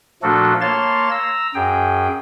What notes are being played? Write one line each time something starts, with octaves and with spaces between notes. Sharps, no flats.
A#2 F3 A3 D4 F#4 A4
A#3 C#5 F5 A5 C6 A6
A#5 E6
F#2 G#4 G5